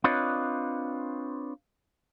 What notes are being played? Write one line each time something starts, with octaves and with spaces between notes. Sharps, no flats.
C4 D4 F4 B4 C#5 D#5